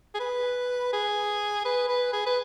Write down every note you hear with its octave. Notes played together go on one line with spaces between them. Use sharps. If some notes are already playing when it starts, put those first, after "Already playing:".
G#4
B4
G#4
B4
B4
G#4
B4